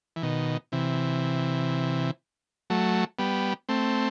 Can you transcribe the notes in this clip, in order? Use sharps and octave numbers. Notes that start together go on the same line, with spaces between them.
E3
B2 D#3
C3 E3
F#3 A3
G3 B3
A3 C4